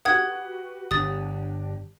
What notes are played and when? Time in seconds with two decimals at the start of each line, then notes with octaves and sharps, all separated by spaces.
0.05 F#4 G4 B4 F#5 D#6 G#6
0.91 G1 D4 G4 D#6 A6